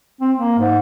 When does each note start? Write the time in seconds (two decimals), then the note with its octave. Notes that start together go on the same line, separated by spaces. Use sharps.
0.21 C4
0.38 A#3
0.58 G#2